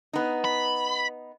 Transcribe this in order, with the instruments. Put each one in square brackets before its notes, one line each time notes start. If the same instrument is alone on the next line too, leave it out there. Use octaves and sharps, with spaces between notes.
[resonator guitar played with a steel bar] B3 D#4
[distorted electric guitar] B5